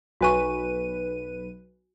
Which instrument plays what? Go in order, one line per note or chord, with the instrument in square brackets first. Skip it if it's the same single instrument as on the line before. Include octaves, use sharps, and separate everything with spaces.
[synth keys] B1 B4 D#7 [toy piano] F#4 G#5 C#6